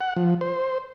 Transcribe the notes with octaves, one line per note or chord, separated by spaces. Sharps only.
F#5
F3
C5